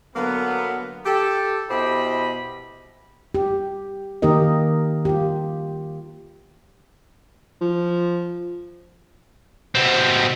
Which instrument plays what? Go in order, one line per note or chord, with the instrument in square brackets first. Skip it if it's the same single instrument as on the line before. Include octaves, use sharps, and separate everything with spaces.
[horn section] D3 F#3 A#3 B3
G4 A4
B2 E4 G4 C5 D#5 B5
[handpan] G4
D#3 A#3 D#4 G4 A#4 D#5
F4 G4
[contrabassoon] F3
[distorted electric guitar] B2 C4